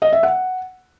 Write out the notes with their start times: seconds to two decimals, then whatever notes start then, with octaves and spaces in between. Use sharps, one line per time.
0.02 D#5
0.12 E5
0.23 F#5